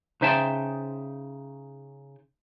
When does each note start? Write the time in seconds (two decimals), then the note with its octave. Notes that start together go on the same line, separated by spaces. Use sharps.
0.21 C#3 D#4 C5 E5 G5 A5